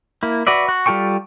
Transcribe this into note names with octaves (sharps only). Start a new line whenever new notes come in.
A#3 E4
F#4 B4 D5 E5
F#4
G3 F4 A4 G5 C#6